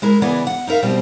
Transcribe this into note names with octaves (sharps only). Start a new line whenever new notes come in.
G#3 E4 A#4
C#3 E3 B3 G#4 D5 F#5
F#5
D#4 E4 A#4 E5 F5
F2 B2 G3 C4